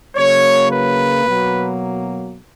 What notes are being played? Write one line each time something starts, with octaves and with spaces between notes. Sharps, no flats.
C#3 F#3 A#3 C#5
B4
B2 F#3 A#3